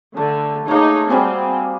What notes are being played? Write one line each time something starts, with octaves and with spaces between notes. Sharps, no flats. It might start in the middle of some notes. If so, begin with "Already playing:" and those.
D3 A3
A3 A#3 D#4 G#4 C#5
G3 C4 F#4 G#4